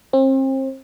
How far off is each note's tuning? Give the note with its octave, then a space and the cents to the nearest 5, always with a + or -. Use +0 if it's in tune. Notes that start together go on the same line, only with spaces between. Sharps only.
C4 +35